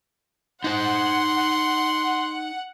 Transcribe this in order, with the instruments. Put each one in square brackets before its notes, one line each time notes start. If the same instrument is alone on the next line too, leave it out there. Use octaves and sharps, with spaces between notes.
[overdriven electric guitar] D#4 C5 [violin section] F#5 [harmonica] C6